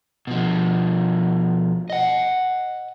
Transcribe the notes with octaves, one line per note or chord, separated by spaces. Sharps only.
B2 F3
D#5 F#5